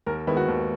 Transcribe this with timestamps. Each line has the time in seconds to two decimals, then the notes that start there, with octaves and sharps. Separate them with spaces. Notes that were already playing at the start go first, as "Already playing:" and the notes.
0.06 D#2 A#4
0.27 D#3 G#3 B3 E4
0.37 F#4
0.48 D#2